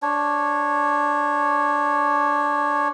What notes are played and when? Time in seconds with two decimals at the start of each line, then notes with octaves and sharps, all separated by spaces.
0.02 D4 C#5